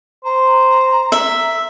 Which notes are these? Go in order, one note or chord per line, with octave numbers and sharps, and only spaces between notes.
C5 A#5
E5